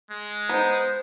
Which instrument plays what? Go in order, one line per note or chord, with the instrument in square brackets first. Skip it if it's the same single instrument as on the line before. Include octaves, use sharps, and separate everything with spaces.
[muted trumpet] G#3
[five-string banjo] B3 D#4 [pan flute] C5